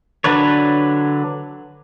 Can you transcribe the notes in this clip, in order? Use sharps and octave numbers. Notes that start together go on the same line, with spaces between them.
D3 F#3 D4 B4 C#5